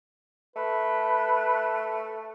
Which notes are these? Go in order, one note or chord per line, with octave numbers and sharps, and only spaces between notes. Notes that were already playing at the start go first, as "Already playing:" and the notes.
A3 B4